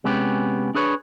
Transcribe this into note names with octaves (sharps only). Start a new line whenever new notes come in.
C3 G#3 B3 C#4 G4
D4 G#4 B4 C#5